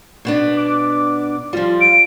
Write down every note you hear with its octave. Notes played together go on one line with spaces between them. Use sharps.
B2 B3 D4
D6
F3 G3 F4
D7